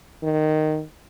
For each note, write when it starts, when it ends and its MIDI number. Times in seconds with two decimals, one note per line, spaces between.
0.23 0.82 51